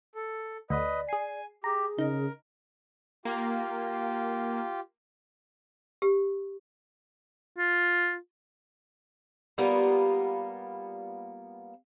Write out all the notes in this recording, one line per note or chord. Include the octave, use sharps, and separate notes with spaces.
A4
D2 B4 D5 D#5
G#4 G#5 C7
G4 G#4 A#5
C#3 D#4 A#4
A#3 F4 G4
G4
F4
G3 A#3 B3 F4